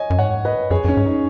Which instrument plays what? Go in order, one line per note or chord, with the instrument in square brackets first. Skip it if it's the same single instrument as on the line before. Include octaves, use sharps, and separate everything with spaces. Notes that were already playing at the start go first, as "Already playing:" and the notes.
Already playing: [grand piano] C#5 D#5 G#5
[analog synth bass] F#2
[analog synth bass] G#2 [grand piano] C#5 F#5
[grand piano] B4 D#5
[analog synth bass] F#2 [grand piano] G#4 C#5
[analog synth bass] F#2 [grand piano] C#4
[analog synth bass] G#2
[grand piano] D#4